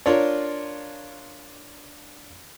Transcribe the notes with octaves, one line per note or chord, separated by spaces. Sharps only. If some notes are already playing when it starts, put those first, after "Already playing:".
D4 F4 A#4 C#5 D5